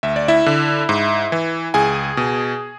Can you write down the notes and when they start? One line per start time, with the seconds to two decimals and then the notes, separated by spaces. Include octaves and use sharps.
0.03 D2 E5
0.16 D5
0.28 E4 E5
0.46 D3
0.89 G#2
1.32 E3
1.74 C#2 G#4 G#5
2.17 B2